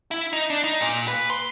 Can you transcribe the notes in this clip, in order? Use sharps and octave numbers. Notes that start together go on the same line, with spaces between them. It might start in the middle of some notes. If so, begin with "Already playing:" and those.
E4
D#4
D4
D#4
A#2
B4
C6